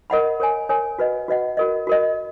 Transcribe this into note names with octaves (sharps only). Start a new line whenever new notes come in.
A#4 D#5 F#5 B5
A#4 C#5 G#5
A#4 C#5 G#5
F#4 B4 D#5 F#5
F#4 B4 D#5 F#5
F#4 A#4 D#5
F#4 A#4 D#5